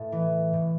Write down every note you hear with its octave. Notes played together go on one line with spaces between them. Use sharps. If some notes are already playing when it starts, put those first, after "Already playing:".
Already playing: A2 A4
E3
A2